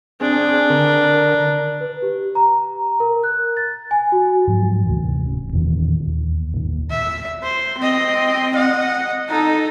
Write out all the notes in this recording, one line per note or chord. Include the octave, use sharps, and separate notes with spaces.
C4 D4 G#4
D3 A#4
B4
G4
A#5
A#4
F#6
A6
G#5
F#4
G#2 F3 F#3
D2 C3 E3
D1 C#4
E2 A#2 D#3 E3
D#2
D#2 A#2 D#3
E5
C5
C4 D#5
D#5 F#5
D#4 A4